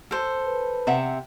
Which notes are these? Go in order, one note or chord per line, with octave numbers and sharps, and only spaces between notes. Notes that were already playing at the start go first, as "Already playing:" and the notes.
A4 C5
B4
C3 E5 F#5